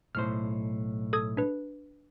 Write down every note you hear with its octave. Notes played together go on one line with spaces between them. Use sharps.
B1 A2 C5 F6
A4 D#6 G#6
D4 B4